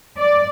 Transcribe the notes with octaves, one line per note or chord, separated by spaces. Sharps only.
D5